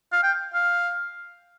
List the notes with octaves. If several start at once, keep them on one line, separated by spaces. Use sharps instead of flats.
F5
G5
F5